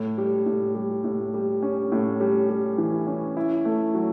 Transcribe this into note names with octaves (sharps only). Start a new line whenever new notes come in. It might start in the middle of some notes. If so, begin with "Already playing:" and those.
Already playing: A2
G3
A2
G3
A2
G3
C#4
A2
G3
G3
E3
C#4
E4
A3
F#3